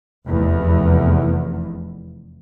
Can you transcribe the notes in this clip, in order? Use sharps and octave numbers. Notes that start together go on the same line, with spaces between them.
F1 E2